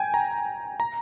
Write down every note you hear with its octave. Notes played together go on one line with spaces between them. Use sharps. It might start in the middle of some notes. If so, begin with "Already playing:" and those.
Already playing: G5 G#5
A#5
A#5